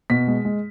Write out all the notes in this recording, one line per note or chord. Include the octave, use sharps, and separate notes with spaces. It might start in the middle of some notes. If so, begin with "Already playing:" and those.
B2 B6
G#3
G#3